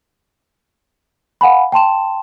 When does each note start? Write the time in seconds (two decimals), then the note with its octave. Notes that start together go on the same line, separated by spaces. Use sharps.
1.41 F5 F#5 G#5 B5
1.72 G5 A5 C6 E7